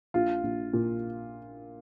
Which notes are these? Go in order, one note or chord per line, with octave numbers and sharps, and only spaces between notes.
A#1 F4
A#1
A#2